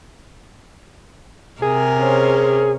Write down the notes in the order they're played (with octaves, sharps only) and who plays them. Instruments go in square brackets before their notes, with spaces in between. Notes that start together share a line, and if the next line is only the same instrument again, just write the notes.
[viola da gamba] C3 A#4 [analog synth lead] G#4
[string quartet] C#4 C5 C#5